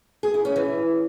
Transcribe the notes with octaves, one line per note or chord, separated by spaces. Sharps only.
G#4
E4
C#4
E3